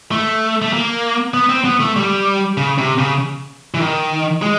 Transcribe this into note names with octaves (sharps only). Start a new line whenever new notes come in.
A3
A3
A#3
B3
C4
B3
A3
G3
C#3
C3
C#3
E3
D#3
G#3